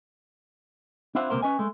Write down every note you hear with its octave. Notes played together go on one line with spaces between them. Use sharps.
C4 D4 E4 F4 C5 F#5
C#2 C3 G#3 A#3 A#4 C5
C#4 B4 D#5 G#5
G#3 A3